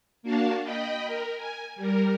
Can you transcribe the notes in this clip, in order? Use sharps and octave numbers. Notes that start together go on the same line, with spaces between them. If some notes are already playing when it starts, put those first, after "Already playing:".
A#3 D4 F#4 F5 A5
D#5 G5 B5
A#4
G#5
G3 A#4